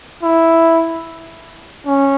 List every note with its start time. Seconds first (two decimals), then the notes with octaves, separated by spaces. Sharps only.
0.23 E4
1.87 C#4